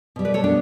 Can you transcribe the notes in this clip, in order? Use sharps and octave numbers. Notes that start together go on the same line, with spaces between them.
B2 G3
B4 D5
A4 C#5
B3 D4